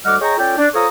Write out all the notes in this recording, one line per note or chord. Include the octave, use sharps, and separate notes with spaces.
D2 G3 D#5 F#5 D6 F6
G#4 C#5 D#5 G5 A#5 C#6
C#4 F4 A4 D5 G5
D4
F4 A4 C5 C#5 A#5 D#6